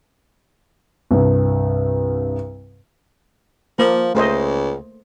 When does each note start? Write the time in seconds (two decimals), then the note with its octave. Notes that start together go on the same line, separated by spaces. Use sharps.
1.11 C2 G2
3.79 F3 A#3
4.15 C#2 A3 C5 D#5